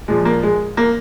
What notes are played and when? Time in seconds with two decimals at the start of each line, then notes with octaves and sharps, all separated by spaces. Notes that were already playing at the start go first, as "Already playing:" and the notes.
0.08 A#2 F3 G#3
0.25 A#3
0.43 G#3
0.77 A#3